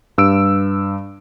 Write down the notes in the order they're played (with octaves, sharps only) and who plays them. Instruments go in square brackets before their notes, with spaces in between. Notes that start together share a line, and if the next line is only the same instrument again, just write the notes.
[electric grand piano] G2 E6 D7